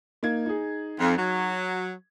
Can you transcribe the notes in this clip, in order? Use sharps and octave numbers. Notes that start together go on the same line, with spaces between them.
A#3 D#4 G#6
D#4 G#4
F2
F#3